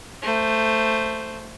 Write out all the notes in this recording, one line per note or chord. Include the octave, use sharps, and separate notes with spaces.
A3 C5